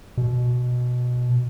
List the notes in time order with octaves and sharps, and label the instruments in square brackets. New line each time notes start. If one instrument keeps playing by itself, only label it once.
[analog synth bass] B2